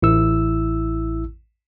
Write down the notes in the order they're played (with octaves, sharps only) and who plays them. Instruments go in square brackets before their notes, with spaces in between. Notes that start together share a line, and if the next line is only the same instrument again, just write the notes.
[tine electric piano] A1 E4 E6